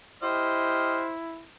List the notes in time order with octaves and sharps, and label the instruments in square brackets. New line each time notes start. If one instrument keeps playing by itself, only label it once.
[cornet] E4 [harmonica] G4 D#5 F6 [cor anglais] C5